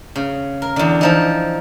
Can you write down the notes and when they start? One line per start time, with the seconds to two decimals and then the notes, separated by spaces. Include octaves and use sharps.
0.16 C#3
0.62 A#4
0.76 E2 D3
1.01 E3 F3 D#4